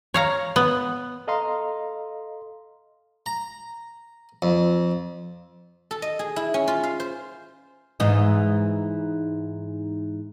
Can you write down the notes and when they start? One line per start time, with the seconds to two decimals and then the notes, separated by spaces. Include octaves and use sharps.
0.14 C#5 F5 A#5
0.56 B3
1.28 A4 D#5 F5 A#5 C6
3.26 A#5
4.42 F2
5.91 A4
6.02 D#5
6.19 G#4
6.36 E4
6.54 C#4
6.68 F4
6.83 F5
7.00 C5
8.00 G#2 E3 D#4